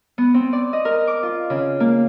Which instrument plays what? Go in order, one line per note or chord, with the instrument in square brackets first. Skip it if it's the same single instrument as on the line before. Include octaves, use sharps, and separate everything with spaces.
[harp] B3
C4
D5
D#5
A#4
D6
F4
C#3
A#3